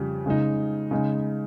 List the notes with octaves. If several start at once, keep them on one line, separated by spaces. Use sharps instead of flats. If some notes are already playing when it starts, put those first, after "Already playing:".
Already playing: F2 C#3 G3
C#3 G#3 D#4
C#3 G#3 D#4